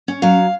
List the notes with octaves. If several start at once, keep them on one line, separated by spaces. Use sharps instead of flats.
C#4
F#3 F5